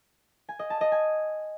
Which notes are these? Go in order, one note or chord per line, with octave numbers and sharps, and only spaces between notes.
G#5
D#5
A5
D#5
G#5